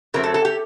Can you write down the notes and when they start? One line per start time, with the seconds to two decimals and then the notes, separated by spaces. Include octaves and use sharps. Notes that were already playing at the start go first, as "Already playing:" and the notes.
0.14 F#2 F#3 A3 C4 A#4
0.24 A4
0.34 A4
0.45 G4